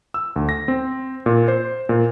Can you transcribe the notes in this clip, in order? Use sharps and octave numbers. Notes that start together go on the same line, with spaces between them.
E6
D2
A#6
C4
A#2
C5
A#2